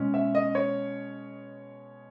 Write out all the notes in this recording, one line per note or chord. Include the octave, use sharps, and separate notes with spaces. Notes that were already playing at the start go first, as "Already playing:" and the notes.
Already playing: B2 G#3 C#4
E5
D#5
C#5